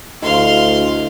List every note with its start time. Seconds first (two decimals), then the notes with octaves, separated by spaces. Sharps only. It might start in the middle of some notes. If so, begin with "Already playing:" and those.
0.22 D2 E4 F#4 D#5 F5 C6